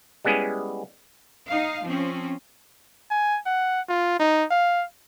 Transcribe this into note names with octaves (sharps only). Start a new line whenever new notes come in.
G3 G#3 B3 C#4 E4 G#4
D#4 F5
F3 C4 C#4
G#5
F#5
F4
D#4
F5